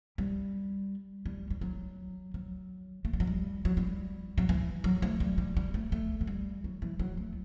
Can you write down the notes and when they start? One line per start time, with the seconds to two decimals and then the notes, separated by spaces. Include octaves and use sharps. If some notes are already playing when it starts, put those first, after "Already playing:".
0.18 G3
1.26 G3
1.50 G3
1.61 F#3
2.34 F#3
3.05 A3
3.13 G3
3.20 F#3
3.27 G3
3.65 F#3
3.77 G3
4.38 F#3
4.49 E3
4.84 F#3
5.02 A3
5.20 G3
5.38 G3
5.57 G3
5.74 A3
5.92 A3
6.21 F#3
6.27 G3
6.64 F#3
6.82 E3
6.99 F#3
7.17 A3